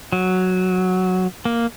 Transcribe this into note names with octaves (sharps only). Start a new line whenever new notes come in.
F#3
A#3